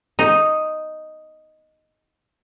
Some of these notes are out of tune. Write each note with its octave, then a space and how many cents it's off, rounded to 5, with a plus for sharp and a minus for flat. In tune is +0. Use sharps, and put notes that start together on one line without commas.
D#4 +0